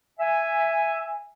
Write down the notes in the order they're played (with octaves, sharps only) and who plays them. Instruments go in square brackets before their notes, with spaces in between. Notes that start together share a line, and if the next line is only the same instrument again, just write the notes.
[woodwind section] E5 G#5